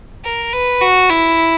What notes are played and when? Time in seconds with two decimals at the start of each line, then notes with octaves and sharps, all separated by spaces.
0.25 A#4
0.53 B4
0.81 F#4
1.10 E4